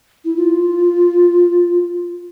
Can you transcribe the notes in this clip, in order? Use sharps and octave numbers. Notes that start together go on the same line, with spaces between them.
E4
F4